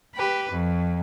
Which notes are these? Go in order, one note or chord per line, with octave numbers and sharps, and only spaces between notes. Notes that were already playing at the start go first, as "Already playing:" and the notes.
G4 B4
F2